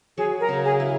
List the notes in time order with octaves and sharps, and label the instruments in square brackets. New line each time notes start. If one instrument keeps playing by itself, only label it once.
[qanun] F#3 [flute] G#4
[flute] A#4
[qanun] C#3
[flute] G#4
[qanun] E4